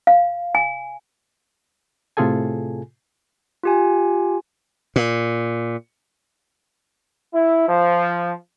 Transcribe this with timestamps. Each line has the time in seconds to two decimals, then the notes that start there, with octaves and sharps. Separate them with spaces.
0.07 F5
0.55 G#5
2.17 A2 C3 F4 G#4 A4 G#5
3.63 F4 G4 G#5
4.96 A#2
7.34 E4
7.69 F3